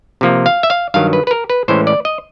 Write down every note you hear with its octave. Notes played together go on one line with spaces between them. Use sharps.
C3 F3 A#3
F5
E5
F5
G2 D#3 F#3 F5
B4
B4
A#4
B4
A2 E3 G#3 C#4 C5
D5
D#5